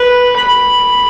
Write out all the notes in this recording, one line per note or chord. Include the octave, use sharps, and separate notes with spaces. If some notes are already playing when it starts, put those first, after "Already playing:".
Already playing: B4
B5